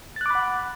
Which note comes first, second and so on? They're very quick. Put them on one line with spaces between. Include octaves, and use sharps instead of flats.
A6 F#6 D6 B5 F#5